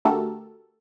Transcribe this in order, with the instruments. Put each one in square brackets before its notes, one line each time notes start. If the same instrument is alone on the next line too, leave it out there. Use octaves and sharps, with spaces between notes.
[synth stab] D3 A3 F#4 G4 A4 A#4